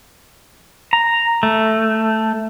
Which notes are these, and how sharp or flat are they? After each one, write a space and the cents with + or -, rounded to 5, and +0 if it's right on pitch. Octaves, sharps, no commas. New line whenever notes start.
A#5 -5
A3 +5